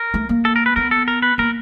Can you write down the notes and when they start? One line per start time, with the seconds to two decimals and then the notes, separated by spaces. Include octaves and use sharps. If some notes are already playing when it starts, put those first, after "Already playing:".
Already playing: A#4
0.14 A3
0.29 A#3
0.45 A4
0.56 A#4
0.66 B4
0.76 B3 A#4
0.91 A4
1.08 A#4
1.22 B4
1.38 A#3 A#4